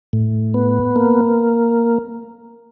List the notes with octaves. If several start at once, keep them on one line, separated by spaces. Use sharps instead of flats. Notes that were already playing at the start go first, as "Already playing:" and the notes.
A2
B3
A#3